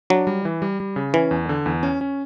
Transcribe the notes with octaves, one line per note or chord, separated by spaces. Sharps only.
F#3 D4
G3
E3
G3
G3
C#3
E3 C#4
E2
D3
E2
C#4
C#4